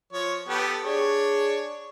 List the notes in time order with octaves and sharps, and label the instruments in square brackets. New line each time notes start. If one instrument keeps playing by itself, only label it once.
[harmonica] F3 C#5
B3 G4 A4
[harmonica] D4 C#5 [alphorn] G#4